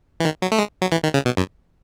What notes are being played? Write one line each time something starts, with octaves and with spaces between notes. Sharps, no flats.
E3
D#3
F#3
A3
G#3
F#3
E3
D#3
C#3
B2
F#2